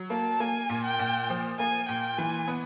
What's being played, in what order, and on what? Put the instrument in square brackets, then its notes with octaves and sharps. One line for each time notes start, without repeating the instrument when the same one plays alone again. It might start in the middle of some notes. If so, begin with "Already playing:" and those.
Already playing: [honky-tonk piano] F#3
[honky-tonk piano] A#3 [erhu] A5
[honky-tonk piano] A#3 [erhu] G#5
[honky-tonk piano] A#2
[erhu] G5
[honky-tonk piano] A#2
F3
[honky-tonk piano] A#3 [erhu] G#5
[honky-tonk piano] A#2 [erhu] G5
[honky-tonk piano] E3 [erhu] G#5
[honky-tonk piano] B3